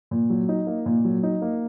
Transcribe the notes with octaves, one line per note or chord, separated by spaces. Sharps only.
A#2
F#3
D#4
A#3
A#2
F#3
D#4
A#3